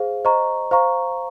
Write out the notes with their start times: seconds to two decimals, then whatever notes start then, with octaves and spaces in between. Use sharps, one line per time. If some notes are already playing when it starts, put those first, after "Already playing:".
Already playing: G#4 C5 F5
0.25 C5 D#5 A#5 C#6
0.71 C5 F5 A#5 C#6